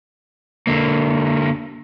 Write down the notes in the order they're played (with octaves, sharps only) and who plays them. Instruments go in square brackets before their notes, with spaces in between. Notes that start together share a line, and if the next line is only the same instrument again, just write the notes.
[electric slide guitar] D3 A#3